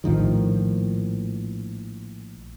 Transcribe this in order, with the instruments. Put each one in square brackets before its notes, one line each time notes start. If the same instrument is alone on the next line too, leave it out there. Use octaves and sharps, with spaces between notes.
[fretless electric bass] A#1 A2 D#3 F3